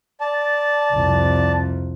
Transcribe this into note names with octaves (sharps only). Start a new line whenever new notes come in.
D5 A5
C2 F2